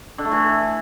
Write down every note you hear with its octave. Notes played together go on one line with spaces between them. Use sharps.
D3
A3
E3